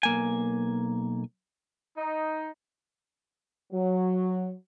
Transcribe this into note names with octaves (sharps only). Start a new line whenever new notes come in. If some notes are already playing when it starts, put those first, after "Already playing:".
B1 A#3 G#5
D#4
F#3